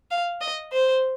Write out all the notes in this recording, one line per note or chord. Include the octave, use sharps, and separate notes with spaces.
F5
D#5
C5